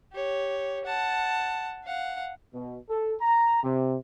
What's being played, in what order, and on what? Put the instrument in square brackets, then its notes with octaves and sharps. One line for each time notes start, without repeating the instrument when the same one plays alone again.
[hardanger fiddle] G4 C#5
F#5 A5
F5 F#5
[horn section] B2
A4
A#5
C3